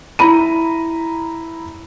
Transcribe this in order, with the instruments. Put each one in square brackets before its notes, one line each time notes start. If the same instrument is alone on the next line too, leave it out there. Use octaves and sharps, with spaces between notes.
[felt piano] E4 A#5 B5 D#7